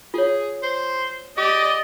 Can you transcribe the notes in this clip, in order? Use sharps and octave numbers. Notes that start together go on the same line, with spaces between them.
F4 G#4 C#5
C5
G4 D5 D#5